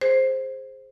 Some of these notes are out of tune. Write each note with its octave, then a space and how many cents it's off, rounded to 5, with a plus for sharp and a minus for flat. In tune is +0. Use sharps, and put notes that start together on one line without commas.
G#4 +0 C5 +5